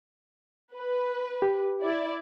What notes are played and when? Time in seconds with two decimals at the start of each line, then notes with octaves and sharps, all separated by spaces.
0.76 B4
1.42 G4
1.83 E4 D5